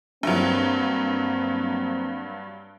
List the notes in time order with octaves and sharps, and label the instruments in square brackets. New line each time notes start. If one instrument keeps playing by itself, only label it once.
[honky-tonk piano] G2 F#3 [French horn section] A#3 C4